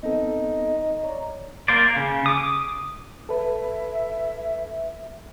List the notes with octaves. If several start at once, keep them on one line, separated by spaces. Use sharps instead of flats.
B3 C4 D#4 A4
C#5 D5 A#5
A#3 C5 D5
C#3
D6 D#6
A4 B4 E5